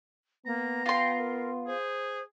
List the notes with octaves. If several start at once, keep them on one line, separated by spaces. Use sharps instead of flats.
A#3 B3 A#5
F4 G5 C6
A#4
G#4 C5